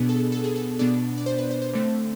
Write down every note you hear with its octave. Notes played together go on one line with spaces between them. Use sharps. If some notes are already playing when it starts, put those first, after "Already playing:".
Already playing: B2 B3 D4 G#4
A4
A4
G#4
A4
B2 B3 D4 D5
D5
C5
B4
C5
C5
D3 A3 C4